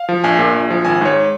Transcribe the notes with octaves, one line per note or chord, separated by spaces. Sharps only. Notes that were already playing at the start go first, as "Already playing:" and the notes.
Already playing: F5
F3
A#1 G#5
A#2
A#1
F3
G#1 G#5
G#2 C#5